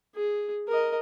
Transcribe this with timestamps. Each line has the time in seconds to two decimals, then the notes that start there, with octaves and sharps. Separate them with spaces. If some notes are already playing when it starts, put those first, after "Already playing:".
0.15 G#4
0.68 A#4 D#5